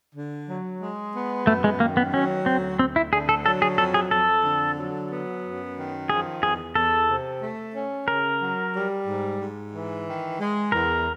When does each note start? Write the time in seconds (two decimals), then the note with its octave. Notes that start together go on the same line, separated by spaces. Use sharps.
0.15 D3
0.48 F#3
0.81 G#3
1.15 B3
1.47 F#2 A3
1.64 G#3
1.80 D#3 A#3
1.97 B3
2.14 F#3 C#4
2.46 D2 C4
2.79 D2 C4
2.96 E4
3.12 D3 G#4
3.29 A4
3.45 F#3 A4
3.62 G#4
3.78 F2 A4
3.94 G#4
4.11 F2 A4
4.44 D3
4.78 F#3
5.10 B3
5.43 F#2
5.76 D#3
6.10 F3 G#4
6.43 E2 G#4
6.75 E2 A4
7.09 C3
7.42 A3
7.75 C#4
8.08 C#3 A#4
8.41 F#3
8.75 G3
9.07 G#2
9.41 G#2
9.73 E3
10.06 D#3
10.40 G#3
10.72 E2 A#4